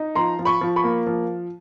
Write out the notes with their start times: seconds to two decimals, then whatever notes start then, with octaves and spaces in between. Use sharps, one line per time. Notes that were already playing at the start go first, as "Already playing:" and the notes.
Already playing: D#4
0.15 F3 A#5 C6
0.39 F3
0.45 B5 C#6
0.61 F3
0.76 B5 C#6
0.84 A#3
1.07 F3